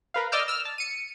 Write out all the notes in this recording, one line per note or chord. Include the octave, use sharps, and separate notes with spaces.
A#4 B4 F5
D5 D#5 D6 E6 F6 G6
E6 F6
A5
C#7 D#7